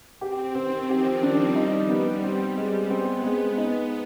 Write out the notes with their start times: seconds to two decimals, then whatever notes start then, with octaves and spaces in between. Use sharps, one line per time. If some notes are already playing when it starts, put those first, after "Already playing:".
0.21 C4 G4
0.55 D#3 C4
0.88 F3 G4
1.22 G3 D4
1.55 D#4
1.89 B3
2.24 C4
2.57 G#3
2.90 B3 C4
3.24 G#3
3.57 B3 D#4